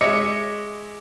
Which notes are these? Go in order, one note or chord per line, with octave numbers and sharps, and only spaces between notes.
G#3 C#5 D#5 E5 D6 C#7